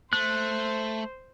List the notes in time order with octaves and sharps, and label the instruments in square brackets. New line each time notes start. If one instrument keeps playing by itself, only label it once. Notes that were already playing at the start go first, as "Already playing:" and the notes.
[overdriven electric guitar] A3 [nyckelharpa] C5 [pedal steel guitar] F#6